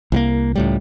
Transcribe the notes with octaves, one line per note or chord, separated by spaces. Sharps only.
C2 F#3 A#3
C#2 A2 G3